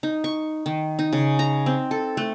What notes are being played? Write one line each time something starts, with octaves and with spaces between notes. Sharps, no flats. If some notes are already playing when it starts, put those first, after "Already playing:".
D#4
C#6
D#3
D#4
C#3
A#5
C4
A4
A3